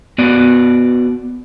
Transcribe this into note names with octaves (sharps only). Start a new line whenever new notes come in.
B3 F#4 D5